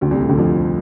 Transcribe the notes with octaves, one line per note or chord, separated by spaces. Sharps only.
D2 D3
C2 C3
A2
D2 D3
F2 F3